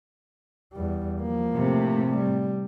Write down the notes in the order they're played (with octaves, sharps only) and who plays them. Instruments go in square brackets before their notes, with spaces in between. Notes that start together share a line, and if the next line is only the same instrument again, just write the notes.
[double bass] E2 G3
F3 A#3
[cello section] A2 C3 A3
[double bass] G3